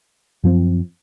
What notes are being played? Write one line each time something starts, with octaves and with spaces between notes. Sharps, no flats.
F#2 F3 C4